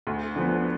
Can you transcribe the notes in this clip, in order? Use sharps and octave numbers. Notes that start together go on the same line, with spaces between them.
D2
D3 F3 B3